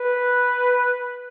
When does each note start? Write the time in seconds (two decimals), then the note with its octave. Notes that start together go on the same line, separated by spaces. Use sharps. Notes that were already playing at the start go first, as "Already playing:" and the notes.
Already playing: B4